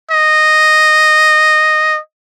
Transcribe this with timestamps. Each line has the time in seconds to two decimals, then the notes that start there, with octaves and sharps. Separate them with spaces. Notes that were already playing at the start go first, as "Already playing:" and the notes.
0.11 D#5